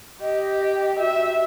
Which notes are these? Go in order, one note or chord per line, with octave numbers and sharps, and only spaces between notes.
G4 D#5
F#4 E5